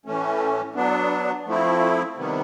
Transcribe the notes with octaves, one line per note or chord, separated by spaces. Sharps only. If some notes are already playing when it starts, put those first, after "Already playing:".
A2 E3 A3 C#4
F#3 B3 D4
F3 A3 C4 E4
C3 D#3 G3 B3